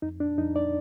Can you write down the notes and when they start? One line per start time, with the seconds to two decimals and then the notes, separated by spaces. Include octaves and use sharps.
0.02 F2 D#4
0.20 D4
0.38 F2 D#4
0.56 D5